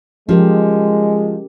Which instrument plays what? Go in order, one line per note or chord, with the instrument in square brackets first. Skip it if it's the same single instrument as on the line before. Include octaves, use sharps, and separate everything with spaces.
[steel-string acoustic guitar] F3 [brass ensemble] G#3 [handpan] C#4 G4 A#4